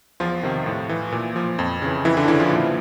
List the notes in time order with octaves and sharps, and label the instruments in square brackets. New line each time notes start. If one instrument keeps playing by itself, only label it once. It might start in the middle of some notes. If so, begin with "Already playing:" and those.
[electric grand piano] E2 F3 F4
C3 D#3
A2
E3
A#2
F3
F2
C#3 E3
F2 E3 E4
D3 D4
C#3 E3 E4
F3 F4
A#2